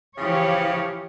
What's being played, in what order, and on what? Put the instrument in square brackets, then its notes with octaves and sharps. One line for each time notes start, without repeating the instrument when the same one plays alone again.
[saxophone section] C#3 F3 [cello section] E3 G4 C#5